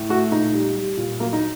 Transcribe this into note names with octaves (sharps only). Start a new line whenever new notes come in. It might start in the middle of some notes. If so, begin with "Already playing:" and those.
Already playing: A2
A3 F#4
A#2 D#4
G3
G3
A#2
F#3 A#3
D#4